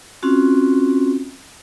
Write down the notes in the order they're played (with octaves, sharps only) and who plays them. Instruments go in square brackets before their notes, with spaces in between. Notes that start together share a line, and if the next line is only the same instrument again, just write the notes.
[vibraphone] C4 C#4 F4 F#4